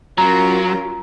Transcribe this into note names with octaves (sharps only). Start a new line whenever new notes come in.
F#3 C#4 F4 A#4 A#5